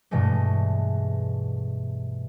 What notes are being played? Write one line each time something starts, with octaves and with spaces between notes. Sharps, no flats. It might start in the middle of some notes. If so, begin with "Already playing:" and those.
G2 B2 E3 G#3 A3